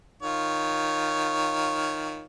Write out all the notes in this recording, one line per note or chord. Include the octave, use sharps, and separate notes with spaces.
D#3 F4 C#5